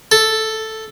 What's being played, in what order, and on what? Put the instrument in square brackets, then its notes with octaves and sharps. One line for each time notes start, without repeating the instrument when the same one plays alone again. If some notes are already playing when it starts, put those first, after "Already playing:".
[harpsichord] A4